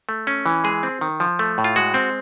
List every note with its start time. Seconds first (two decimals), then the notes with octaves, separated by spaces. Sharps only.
0.09 A3
0.27 C#4
0.46 E3
0.64 G#3 G#4
0.83 C4
1.01 D#3
1.20 F3
1.39 A3
1.58 A2
1.64 F4
1.76 G#3 F#4
1.94 C4